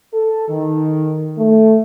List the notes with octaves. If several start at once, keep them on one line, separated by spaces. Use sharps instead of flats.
A4
D#3
A3